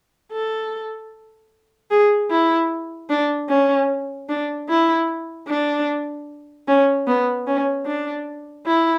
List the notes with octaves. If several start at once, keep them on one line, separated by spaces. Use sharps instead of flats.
A4
G#4
E4
D4
C#4
D4
E4
D4
C#4
B3
C#4
D4
E4